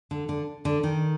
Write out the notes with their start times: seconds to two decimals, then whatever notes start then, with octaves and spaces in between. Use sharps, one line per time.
0.11 D3
0.29 D3
0.65 D3
0.83 D#3